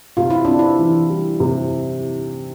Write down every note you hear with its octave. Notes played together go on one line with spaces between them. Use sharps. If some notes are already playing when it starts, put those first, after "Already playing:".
C3 F4
E4
C4 D4
E4
E3
G3
C3